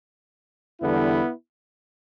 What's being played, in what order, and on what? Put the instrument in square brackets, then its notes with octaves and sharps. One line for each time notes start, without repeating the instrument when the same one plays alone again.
[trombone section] E2 D3 G3 B3 E4